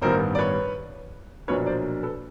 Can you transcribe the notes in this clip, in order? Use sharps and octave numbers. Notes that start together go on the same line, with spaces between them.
A1 G2 D#3 G3 B3 A#4 C5
D5
B4 C#5
B1 A#2 F3 A#3 D4 B4 C#5
C5 D5
A4 B4